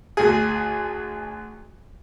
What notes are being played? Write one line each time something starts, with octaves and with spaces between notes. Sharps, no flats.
D2 G#4